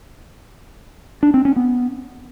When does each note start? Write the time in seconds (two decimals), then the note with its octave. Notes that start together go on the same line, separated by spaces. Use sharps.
1.23 D4
1.34 C4
1.45 C#4
1.56 B3